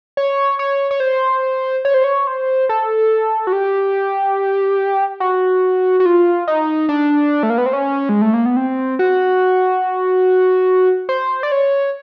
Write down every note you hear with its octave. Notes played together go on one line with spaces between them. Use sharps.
C#5
C#5
C#5
C5
C#5
C5
C#5
C5
A4
F#4
G4
F#4
F#4
F4
D#4
D4
A3
A#3
B3
C4
C#4
G#3
A3
A#3
B3
C4
F#4
C5
D5
C#5